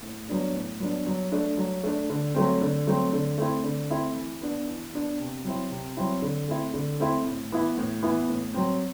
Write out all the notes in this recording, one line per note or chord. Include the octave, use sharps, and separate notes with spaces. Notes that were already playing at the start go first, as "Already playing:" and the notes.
A2
F#3 B3 D4
A2
F#3 B3 D4
F#3
A3 D4
F#3
A3 D4
D3
F#3 A3 C4
D3
F#3 A3 C4
D3
A3 C4 E4
D3
A3 C4 E4
E3
B3 D4
E3
B3 D4
C3
F#3 C4 E4
C3
F#3 C4 E4
D3
A3 C4 E4
D3
A3 C4 E4
A2
E3 B3 E4
A2
E3 B3 E4
A2
F#3 C4